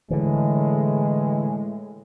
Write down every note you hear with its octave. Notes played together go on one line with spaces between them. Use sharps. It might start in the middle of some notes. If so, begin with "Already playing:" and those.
A2 D3 E3 G#3